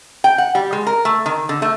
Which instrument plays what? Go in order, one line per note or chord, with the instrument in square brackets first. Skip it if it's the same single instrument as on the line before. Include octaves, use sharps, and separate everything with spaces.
[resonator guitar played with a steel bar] G5
F#5
G3
G#3
A#4
A3
D#3
D3
A3